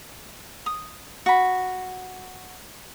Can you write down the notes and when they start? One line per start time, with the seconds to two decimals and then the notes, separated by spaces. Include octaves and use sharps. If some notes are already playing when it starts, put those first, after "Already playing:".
0.66 D#6
1.26 F#4 B5